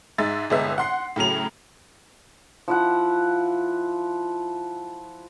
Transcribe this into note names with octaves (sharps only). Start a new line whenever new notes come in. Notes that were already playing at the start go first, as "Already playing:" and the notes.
G#2 G#3 E5 A6
G1 C2 G#3 B3 E5
F#5 C6 C7
A2 C#3 F#3 F7
F3 E4 F#5